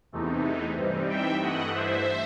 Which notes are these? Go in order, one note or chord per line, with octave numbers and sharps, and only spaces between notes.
E2 C3 E3 A3 D#4
G2 E3 G3 C4 D#4
E5 G5
G2 E3 A3 D#5 F#5
C5 E5